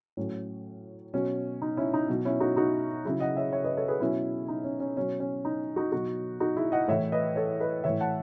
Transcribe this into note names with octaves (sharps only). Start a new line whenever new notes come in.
A2 F#3 C#4
B2 F#3 C#4
D#4
C#4 E4
D#4
B2 F#3
C#4 E4
D#4 F#4
D#4 F#4
C#3 F#3 E4 G#4
D#5 F#5
C#5 E5
C#5 E5
B4 D#5
A4 C#5
G#4 B4
B2 F#3 C#4 E4
D#4
C#4
C#4
B2 F#3 C#4
C#4
D#4
D#4 F#4
B2 F#3 D#4 F#4
D#4 F#4
E4 G#4
D#5 F#5
A2 E3 C#5 E5
B4 D#5
A4 C#5
B4 D#5
A2 E3 C#5 E5
F#5 A5